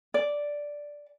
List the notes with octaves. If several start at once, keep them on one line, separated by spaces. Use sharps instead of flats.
D5